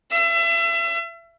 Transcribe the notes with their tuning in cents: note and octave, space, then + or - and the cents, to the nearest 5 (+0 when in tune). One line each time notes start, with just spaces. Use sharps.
E5 +30 E6 +35